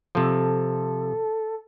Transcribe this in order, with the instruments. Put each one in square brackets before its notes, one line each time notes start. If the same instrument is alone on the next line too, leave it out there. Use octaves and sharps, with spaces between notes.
[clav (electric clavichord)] C3 F3 [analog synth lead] A4